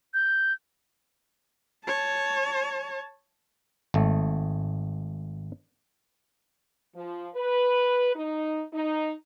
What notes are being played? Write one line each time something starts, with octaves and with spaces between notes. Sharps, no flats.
G6
C#5 A5
G#1 A3
F3
B4
D#4
D#4